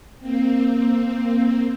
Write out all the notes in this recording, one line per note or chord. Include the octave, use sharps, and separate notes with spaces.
A#3 C4